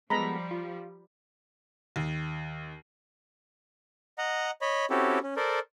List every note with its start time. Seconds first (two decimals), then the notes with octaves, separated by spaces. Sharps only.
0.10 F3 G3 G#3 B3 A4 A#5 B5
0.51 F4
1.96 D#2
4.18 D#5 F#5 A#5
4.61 C#5 D#5 B5
4.90 C4 C#4 E4 F#4 G4 A4
5.23 C#4
5.36 A4 A#4 C5 D5